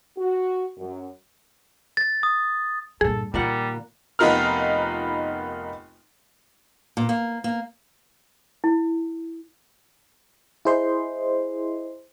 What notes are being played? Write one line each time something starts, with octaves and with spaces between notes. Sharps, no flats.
F#4
F#2
A6
D#6
G2 A#2 G#4 A4
A#2 D#3 G3 A#3 F#5
F1 B3 D#4 F4 A#4 F6
A#2
A#3
A#3
E4
E4 G#4 C5 D#5 C6